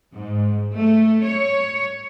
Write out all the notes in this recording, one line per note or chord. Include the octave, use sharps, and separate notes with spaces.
G#2
A3
C#5